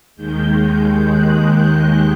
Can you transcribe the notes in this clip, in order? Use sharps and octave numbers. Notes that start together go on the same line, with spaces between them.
D#2 D#3 G#3 G6
G6
F#6
G6